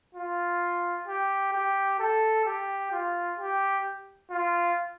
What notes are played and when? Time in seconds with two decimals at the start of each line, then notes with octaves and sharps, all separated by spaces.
0.15 F4
1.07 G4
1.53 G4
1.99 A4
2.45 G4
2.92 F4
3.38 G4
4.30 F4